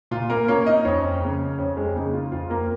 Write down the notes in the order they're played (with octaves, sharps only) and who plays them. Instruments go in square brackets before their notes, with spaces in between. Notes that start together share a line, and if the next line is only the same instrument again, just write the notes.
[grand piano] A#2 F4
A#3 A#4
A#3 C#4 C#5
D#4 D#5
F2 C#4 C#5
C#3 A#3
F2 C#4 C#5
G#3 G#4
C#3 A#3 D#4
F4
F2 F4
A#3 A#4